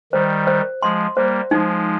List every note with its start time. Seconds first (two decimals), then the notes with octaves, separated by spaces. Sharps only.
0.13 D#3 G3 C5
0.47 C5
0.82 F3 G#3 C6
1.17 G3 A#3 C5
1.51 F3 G#3 D#4